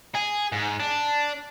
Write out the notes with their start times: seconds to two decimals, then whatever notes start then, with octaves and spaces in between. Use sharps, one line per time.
0.15 G#4
0.52 G#2
0.80 D4